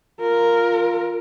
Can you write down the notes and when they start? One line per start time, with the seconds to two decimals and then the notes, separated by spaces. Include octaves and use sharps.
0.21 F4 A#4